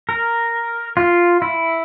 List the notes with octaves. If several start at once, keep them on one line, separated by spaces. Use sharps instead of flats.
A#4
F4
E4